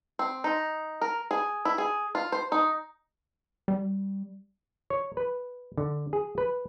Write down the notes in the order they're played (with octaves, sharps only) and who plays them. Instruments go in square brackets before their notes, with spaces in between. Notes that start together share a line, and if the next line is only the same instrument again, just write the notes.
[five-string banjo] C4
D#4
A#4
G#4
E4
G#4
F4
C5
D#4
[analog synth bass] G3
[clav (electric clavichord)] C#5
B4
D3
G#4
B4